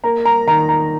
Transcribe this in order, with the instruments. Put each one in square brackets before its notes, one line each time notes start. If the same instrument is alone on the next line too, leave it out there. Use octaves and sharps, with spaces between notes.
[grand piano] A#3 A#5
A#5
D#3 A#5
A#5